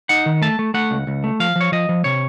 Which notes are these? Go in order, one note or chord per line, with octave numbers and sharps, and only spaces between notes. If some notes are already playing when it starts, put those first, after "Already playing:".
D#4 F#5
D#3
A3 A5
A3
A3 F#5
C#2
C#2
A3
F3 F5
F3
C#5
F3 D#5
F3
C3 C#5